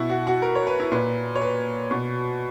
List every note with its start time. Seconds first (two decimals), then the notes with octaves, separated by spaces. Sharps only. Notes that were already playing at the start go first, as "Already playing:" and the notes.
Already playing: B2 E4
0.10 F#4
0.27 F#4
0.42 A#4
0.55 C#5
0.67 B4
0.80 E4
0.92 A#2 B4
1.35 C#5
1.42 B4
1.91 B2